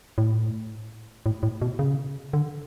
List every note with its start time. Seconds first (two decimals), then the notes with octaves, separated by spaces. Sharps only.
0.18 A2
1.26 A2
1.43 A2
1.62 B2
1.79 C#3
2.33 D3